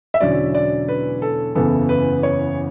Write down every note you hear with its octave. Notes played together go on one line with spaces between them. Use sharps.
E5
E1 E2 D3 F#3 C#4 D5
D5
B4
A4
F#1 E2 C#3 E3 B3 A4
B4
C#5